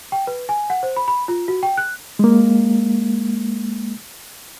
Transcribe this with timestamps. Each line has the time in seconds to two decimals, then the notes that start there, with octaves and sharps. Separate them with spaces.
0.12 G5
0.27 B4
0.49 G#5
0.70 F#5
0.83 C5
0.96 B5
1.08 B5
1.28 F4
1.48 F#4
1.63 G5
1.77 F#6
2.19 G#3 A#3